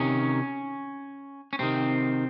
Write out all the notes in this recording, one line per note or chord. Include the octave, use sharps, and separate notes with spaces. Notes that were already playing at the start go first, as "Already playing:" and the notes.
Already playing: C3 D#3 C#4
C#4
C3 D#3 C4